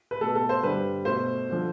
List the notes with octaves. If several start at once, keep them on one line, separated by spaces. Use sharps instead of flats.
B4
B2 A3 A4
A4
C5
G2 D3 G3 B4
B2 A3 C5
D3 F3